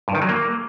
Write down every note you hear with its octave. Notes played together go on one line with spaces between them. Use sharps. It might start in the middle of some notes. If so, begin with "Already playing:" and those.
G2
D#3
F#3
A#3